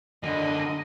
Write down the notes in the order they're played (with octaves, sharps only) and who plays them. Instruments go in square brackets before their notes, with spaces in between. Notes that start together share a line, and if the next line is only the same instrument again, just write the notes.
[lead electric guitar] F#2 D3 [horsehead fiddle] D#5